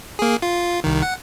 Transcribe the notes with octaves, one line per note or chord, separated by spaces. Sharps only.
A#3 G#4
F4
C2 D#3
F#5